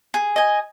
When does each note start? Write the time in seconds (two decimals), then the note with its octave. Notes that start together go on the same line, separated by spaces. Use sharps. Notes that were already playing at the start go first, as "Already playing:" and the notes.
0.14 G#4
0.36 D#5 G#5